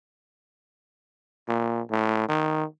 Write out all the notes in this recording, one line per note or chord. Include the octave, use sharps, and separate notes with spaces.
A#2
A2
D#3